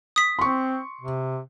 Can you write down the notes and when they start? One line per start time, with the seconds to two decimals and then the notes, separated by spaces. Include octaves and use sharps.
0.16 D#6 B6
0.39 C4 C6 C#6
1.01 C3